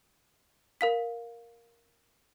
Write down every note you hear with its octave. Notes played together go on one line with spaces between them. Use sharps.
A#4 F5 B6